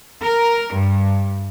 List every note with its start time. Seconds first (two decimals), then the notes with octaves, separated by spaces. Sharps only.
0.22 A#4
0.72 G2